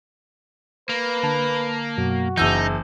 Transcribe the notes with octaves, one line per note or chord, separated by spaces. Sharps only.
A#3 B4
D3 A5
F#2 B2 F#3 F#4
F#1 E3 D#4 E6 G6